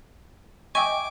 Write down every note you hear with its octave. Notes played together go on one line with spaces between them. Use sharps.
D#5 E5 G5 G#5 C#6 D6